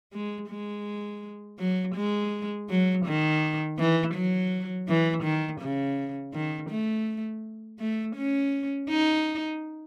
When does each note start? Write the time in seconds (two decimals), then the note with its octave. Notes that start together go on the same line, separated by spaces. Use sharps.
0.13 G#3
0.50 G#3
1.59 F#3
1.95 G#3
2.69 F#3
3.06 D#3
3.79 E3
4.14 F#3
4.88 E3
5.24 D#3
5.61 C#3
6.34 D#3
6.70 A3
7.79 A3
8.16 C#4
8.89 D#4